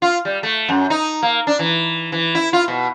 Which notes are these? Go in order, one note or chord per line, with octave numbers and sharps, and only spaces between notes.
F4
G3
A3
F#2
D#4
A#3
D4
E3
E3
E4
F4
B2